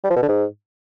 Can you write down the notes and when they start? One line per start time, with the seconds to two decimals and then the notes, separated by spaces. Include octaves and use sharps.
0.04 G3
0.10 F3
0.16 B2
0.23 D3
0.29 G#2